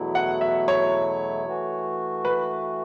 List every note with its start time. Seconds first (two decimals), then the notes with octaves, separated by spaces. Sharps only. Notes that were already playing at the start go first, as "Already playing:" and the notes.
Already playing: E2 B2 F#3 A3 E4
0.15 F#5
0.41 E5
0.68 C#5
1.46 E3 A3 F#4
2.25 B4